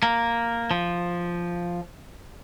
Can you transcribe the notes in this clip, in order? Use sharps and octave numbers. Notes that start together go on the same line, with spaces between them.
A#3
F3